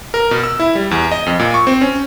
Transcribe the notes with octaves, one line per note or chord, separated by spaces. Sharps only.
A#4
B2
E6
E4
G3
E2
D#5
F2
A#2
C#6
C4
C#4